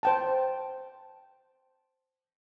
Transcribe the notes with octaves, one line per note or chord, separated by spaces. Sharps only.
C5 G5 A5